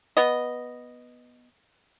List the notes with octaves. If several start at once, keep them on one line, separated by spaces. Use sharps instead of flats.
B3 D#5